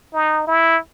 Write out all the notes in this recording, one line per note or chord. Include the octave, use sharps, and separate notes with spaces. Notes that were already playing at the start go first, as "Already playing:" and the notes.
D#4
E4